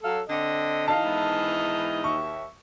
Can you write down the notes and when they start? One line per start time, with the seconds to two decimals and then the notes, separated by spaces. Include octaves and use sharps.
0.03 F#3 A4 F5
0.29 D3 C4 D#5
0.87 E3 D#4 F5 A5 F6
1.04 G#2 B3 E4
2.04 D#2 E5 C#6